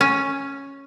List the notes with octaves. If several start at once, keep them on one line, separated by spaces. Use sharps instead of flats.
C#4